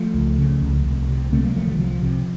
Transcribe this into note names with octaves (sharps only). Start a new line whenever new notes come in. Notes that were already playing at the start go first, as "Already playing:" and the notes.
Already playing: F3 A3
C#2
C#3
C#2
C2
C3
C3 A3 C4
F#3 A#3
C2 F3 A3
D#3 F#3
C3 F3
C3